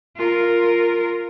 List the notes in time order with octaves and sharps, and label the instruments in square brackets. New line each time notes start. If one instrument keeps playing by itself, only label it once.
[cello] F4 A#4